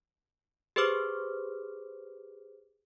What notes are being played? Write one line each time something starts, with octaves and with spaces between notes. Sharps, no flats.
G4 G#4 B4 C5 D6 F6